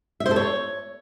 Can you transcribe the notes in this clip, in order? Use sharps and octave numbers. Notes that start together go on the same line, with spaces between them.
E5
C5
A4
C#5